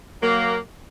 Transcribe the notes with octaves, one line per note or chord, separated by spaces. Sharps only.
F#3 A#3